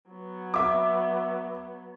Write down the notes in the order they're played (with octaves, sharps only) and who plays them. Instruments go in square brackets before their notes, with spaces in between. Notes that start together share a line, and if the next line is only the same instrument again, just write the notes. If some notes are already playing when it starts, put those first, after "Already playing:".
[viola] F#3 B3
[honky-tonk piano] E5 D6